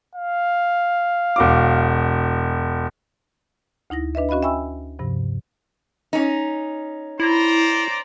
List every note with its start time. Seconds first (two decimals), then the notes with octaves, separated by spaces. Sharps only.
0.16 F5
1.36 E1 F#4 D6
3.90 D2 D#4 E4 A#6
4.15 D4 B4 D#5 E5
4.29 C#4 F#4 D#5 F5 B5
4.43 E5 G5 G#5 B5 C#6 E6
4.99 G2 C3 F3
6.13 C#4 D#4
7.20 E4 C5 D5 A#5